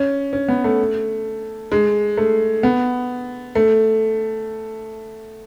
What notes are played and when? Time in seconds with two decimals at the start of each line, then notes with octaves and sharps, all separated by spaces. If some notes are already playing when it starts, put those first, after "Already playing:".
Already playing: C#4
0.33 C#4
0.48 B3
0.64 A3
1.72 G#3
2.17 A3
2.63 B3
3.55 A3